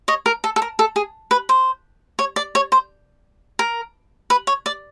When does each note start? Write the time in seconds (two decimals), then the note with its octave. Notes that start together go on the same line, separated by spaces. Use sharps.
0.08 C#5 D#5
0.26 A#4
0.44 A4
0.56 A4
0.62 A#4
0.79 A4
0.96 G#4
1.31 B4
1.49 C5
2.19 C#5
2.36 D5
2.55 C#5
2.72 C5
3.59 A#4
4.30 B4
4.47 C#5
4.66 D5